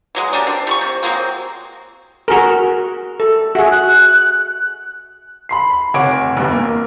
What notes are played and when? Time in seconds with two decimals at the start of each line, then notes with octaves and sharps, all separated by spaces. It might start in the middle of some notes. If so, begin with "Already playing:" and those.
0.15 E3 F#3 G#3
0.33 G3 A#3 C#4 D4
0.47 C4 D4
0.67 G3 C6 C#6
0.81 C3
1.03 F#3 G#3 A#3 C4
2.28 F#4 G#4 A#4
3.20 A4
3.55 F#4 G#4 E5
3.71 F#6
5.49 B5 C6 C7
5.94 F1 C#5 F#5 D6 D7
6.37 E1 G2
6.51 A#3